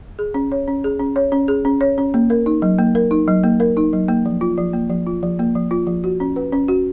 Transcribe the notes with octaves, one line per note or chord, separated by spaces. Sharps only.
G#4
C#4
C#5
C#4
G#4
C#4
C#5
C#4
G#4
C#4
C#5
C#4
A#3
A#4
D#4
F#3
A#3
A#4
D#4
F#3
A#3
A#4
D#4
F#3
A#3
F3
F4
F3
A#3
F3
F4
F3
A#3
F3
F4
F3
F#4
C#4
B4
C#4
F#4